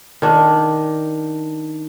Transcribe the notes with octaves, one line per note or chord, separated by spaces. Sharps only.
D#3 D4